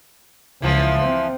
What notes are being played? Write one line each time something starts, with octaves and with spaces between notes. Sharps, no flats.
C#2 E3 F3
C4